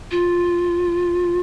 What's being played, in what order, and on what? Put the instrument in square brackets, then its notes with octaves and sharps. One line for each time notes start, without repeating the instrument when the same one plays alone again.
[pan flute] F4